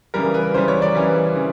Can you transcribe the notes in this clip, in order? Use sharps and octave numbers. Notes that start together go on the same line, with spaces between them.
C#3 E3 G3 A#4
B4
C#3 E3 G3 C5
C#5
D5
C#3 E3 G3
C#3 E3